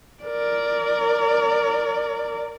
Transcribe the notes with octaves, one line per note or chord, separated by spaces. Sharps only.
A#4 D5